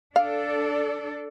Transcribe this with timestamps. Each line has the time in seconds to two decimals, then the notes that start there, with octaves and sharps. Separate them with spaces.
0.16 D4 A4 D5 F5